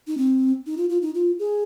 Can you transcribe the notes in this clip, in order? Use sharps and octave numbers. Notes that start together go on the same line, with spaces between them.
D#4
C4
D#4
F4
F4
D#4
F4
G#4